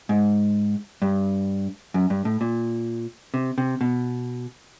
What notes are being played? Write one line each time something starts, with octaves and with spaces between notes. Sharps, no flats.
G#2
G2
F#2
G2
A2
A#2
C3
C3
B2